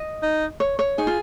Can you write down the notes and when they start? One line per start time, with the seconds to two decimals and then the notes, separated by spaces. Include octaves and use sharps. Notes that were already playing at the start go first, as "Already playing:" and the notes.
Already playing: D#5
0.23 D#4
0.60 C#5
0.79 C#5
0.98 D#4 G#4
1.07 F4